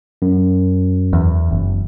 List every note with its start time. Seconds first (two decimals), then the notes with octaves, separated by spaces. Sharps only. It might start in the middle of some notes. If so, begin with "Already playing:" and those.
0.22 F#2
1.13 E2
1.51 F#1